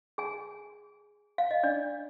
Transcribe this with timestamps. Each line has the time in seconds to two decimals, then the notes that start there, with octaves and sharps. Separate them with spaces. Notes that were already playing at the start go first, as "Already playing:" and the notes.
0.18 G#4 G#5
1.38 F5
1.51 D#5
1.63 D4 D5